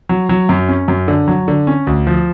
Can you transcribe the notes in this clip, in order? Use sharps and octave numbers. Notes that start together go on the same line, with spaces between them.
F#3
F#3
F#2
C#4
F#2
D3
F#3
D3
C#4
D2
F3